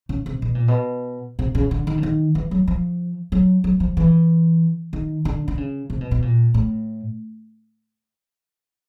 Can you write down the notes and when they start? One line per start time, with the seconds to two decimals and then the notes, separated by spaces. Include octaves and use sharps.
0.09 C#3
0.26 C3
0.42 B2
0.55 A#2
0.68 B2
1.39 C3
1.55 C#3
1.71 D3
1.87 D#3
1.98 D3
2.03 D#3
2.35 E3
2.51 F#3
2.68 F3
3.32 F#3
3.64 F#3
3.80 F3
3.97 E3
4.93 D#3
5.25 D3
5.48 D3
5.58 C#3
5.90 C3
6.01 B2
6.11 B2
6.22 A#2
6.54 A2